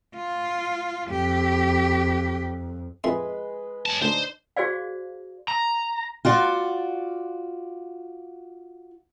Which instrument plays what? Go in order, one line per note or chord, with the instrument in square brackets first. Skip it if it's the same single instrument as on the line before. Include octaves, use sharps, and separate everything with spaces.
[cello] F4
[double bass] F2 [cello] G4
[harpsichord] F2 E5 C6 [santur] G#3 B4
[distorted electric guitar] C#5 A5
[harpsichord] D2 [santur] D4 D#4 [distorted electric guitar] C5
[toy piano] F#4 G#4 C5 D5 F5
[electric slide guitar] A#5
[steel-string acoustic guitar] F4 F#4 D5